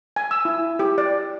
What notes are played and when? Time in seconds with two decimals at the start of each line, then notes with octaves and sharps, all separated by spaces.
0.16 G#5
0.31 E6
0.45 E4
0.79 G4
0.98 D5